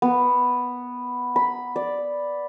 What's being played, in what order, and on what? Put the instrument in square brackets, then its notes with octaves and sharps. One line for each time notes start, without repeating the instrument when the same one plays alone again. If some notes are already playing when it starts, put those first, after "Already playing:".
[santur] B3
B5
D5